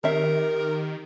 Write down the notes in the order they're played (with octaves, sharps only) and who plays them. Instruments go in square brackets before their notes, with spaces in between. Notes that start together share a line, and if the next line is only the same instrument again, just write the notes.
[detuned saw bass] D#3 [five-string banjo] C4 E5 [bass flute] G4 [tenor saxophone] A#4